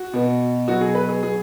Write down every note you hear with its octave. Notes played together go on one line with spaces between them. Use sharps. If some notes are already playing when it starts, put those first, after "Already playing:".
Already playing: F#4
B2 B3
B2 F#3 B3 F#4
G#4
B4
G#4
F#3 B3 G#4